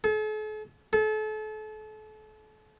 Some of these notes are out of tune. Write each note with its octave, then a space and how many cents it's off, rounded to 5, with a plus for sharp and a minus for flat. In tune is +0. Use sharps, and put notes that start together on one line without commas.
A4 -45
A4 -35